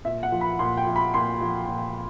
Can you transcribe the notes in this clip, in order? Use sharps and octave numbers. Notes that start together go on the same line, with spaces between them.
A#2 E5
F#5
F3
B5
A#2 C6
G5
F3
B5
A#2 C6
F3
A#2